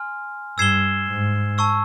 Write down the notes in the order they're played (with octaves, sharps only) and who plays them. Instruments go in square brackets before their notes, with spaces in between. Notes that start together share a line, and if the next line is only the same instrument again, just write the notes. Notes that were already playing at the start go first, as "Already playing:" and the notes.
Already playing: [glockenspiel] G#5 C6 F6
[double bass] G2 [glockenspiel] E6 G#6 C7 E7 G7
[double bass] G#2
[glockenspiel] A5 C#6 E6